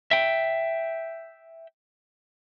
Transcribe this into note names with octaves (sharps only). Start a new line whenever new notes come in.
E5 G5